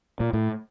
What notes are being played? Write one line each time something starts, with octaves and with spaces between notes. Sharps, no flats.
A#2
A2